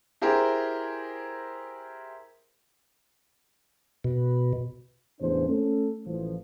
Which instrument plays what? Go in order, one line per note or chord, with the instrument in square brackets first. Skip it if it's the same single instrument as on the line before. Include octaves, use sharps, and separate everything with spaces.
[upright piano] E4 G4 G#4 A#4 C5
[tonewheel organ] B2
[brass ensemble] A1 E2 C#3 D4 C5
A3 C#4 A4
A1 F3